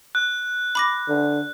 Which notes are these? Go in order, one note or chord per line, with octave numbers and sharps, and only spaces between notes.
F#6
B5 D6 A#6
D3